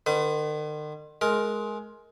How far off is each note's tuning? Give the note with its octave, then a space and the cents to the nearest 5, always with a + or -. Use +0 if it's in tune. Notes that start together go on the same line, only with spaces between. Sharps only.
D#3 -45 B4 +35
G#3 +20 A#4 +0